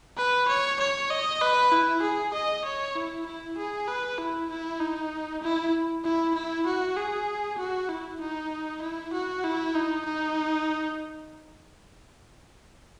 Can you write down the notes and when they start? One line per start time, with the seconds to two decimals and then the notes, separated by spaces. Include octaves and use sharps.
0.18 B4
0.48 C#5
0.80 C#5
1.10 D#5
1.42 B4
1.72 E4
2.03 G#4
2.34 D#5
2.65 C#5
2.96 E4
3.26 E4
3.58 G#4
3.88 B4
4.19 E4
4.50 E4
4.80 D#4
5.43 E4
6.04 E4
6.35 E4
6.67 F#4
6.97 G#4
7.59 F#4
7.89 E4
8.21 D#4
8.82 E4
9.13 F#4
9.44 E4
9.75 D#4
10.06 D#4